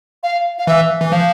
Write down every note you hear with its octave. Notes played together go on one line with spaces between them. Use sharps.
F5
F5
E3 E5
E3
F3 F5